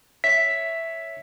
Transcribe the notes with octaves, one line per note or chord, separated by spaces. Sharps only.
C#5 E5 B6